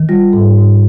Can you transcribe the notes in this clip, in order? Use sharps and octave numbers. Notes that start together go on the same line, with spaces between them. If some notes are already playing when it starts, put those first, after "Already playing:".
Already playing: D#3
G3 F4
G#2 A4
G#2